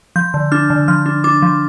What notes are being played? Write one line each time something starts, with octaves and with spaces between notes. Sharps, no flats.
F3 G6
D3
D4 F6
D3
F3 F6
D4
D4 D6
F3